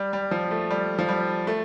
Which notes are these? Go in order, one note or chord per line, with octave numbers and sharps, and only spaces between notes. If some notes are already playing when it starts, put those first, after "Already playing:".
Already playing: G3
G3
F3
A3
G3
F3
G3
A3